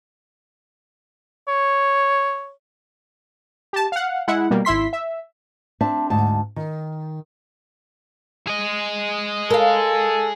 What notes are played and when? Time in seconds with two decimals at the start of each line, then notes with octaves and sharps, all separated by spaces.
1.48 C#5
3.73 G4 A5
3.92 F5 F#5
4.28 G#3 E4 F#5
4.51 B2 G3 A#3
4.65 G#1 E4 E5 C6 B6
4.93 E5
5.81 C4 D4 E5 A5
6.10 D2 G#2 A5
6.56 D#3
8.47 G#4 D#5
9.51 A4 A#4 F5